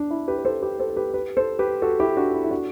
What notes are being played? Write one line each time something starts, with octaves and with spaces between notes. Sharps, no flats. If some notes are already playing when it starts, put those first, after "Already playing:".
Already playing: D4
E4
G4 B4
B4
A4 C5
G4 B4
A4 C5
A4
G4 B4
G4 B4
A4 C5
G4 B4
F#4 A4
E4 G4
D4 F#4
E4
E4
D4 F#4